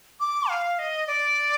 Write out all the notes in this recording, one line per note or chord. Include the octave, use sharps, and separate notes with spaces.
D6
F5
D#5
D5